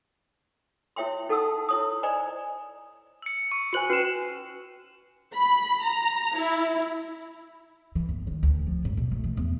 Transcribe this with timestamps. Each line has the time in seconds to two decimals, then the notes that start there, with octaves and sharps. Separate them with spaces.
0.96 E4 C#5 E5 G5 C6
1.29 D#4 A4 F#5 A5 D#6 E6
1.69 E4 C#5 D#6
2.03 C5 D5 D#5 G#5 A#5
3.22 E6 C#7
3.52 C#6
3.73 F#4 C5 G#5 C#7 F#7
3.90 C#4 F#4 B4 C7 E7
5.35 B5
5.83 A#5
6.35 E4
7.95 E3
8.09 G1
8.27 D#3
8.43 D2
8.67 F3
8.85 G#2
8.97 B2
9.12 A3
9.24 E3
9.37 E2